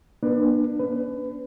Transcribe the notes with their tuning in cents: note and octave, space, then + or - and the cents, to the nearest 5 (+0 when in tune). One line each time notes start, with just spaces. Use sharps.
A#3 +45 D4 +25 B4 +10
D4 -45 B4 +30